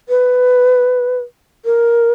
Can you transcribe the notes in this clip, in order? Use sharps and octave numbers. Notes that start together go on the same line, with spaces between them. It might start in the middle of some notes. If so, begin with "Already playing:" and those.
B4
A#4